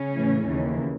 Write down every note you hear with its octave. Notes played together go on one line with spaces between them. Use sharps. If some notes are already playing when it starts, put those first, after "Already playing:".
Already playing: C#3 C#4
A2 E3
D#2 C#3 E3